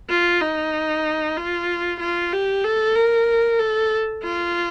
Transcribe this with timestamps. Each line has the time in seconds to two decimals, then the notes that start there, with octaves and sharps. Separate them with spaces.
0.10 F4
0.41 D#4
1.37 F4
2.00 F4
2.32 G4
2.64 A4
2.95 A#4
3.59 A4
4.23 F4